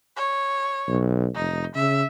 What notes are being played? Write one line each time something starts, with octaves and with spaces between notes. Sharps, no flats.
C#5
B1
F1 D#4
C#3 E5